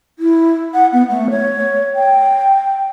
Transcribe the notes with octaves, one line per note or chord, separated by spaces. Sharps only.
E4
F#5
B3
A3
C#5
G5